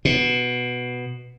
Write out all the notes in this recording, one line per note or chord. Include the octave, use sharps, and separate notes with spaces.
B2